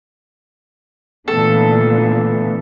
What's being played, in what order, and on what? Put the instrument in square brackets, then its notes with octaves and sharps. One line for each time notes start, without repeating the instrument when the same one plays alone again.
[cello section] A#2 D3 E3 [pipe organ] A3 B3 [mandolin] A4